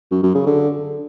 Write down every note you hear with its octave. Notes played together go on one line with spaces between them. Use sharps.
F#2
F#2
C#3
D3